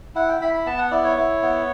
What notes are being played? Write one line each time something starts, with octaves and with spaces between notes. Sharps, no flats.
E4 F#5
G5
E4 B5
B5
B3 A5
F#5
E4 D5
C#5
E4
B3